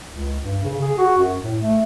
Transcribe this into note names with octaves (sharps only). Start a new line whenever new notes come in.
C#2
G2
C#3
G#4
F#4
F#2
A2
A3